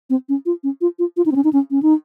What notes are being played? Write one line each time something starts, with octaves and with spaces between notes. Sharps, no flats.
C4
C#4
F4
C#4
F4
F4
F4
D#4
C4
C#4
D#4
C#4
C#4
D#4